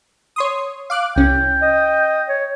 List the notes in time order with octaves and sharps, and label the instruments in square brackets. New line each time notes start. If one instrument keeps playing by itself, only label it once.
[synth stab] C#5 C6 D#6
F5 D6 F#6
[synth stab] C2 C#4 [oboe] G5
[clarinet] D#5
C#5